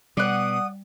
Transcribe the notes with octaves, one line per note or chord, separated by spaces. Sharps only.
B2 G3 D5 F#5 D#6